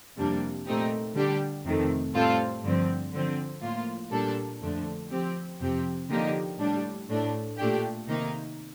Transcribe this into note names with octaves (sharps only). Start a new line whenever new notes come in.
F2 C3 G3 A#3 D4
A#2 A3 C4 D#4 G4
D3 G3 D4 G4
F2 C3 D#3 A3
A2 G3 C4 F4 A4
G2 D3 F3 C4
D3 F3 C4
A2 F3 A#3 F4
A#2 G3 A#3 D4 A4
F2 D3 F3 A3 D4
F3 C4 G4
F2 C3 F3 C4 G4
D3 F3 A#3 D#4 G4
A2 G3 D4
A2 A3 D4
A#2 A3 D4 G4
C3 D#3 A#3 D#4